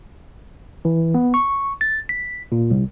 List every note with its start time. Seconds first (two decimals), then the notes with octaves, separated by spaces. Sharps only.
0.85 E3
1.14 B3
1.34 C#6
1.81 A6
2.09 B6
2.52 A#2
2.71 C2